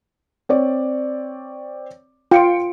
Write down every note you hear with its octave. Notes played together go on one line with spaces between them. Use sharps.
C4 C#5 D5
F4 G5 C#7 D7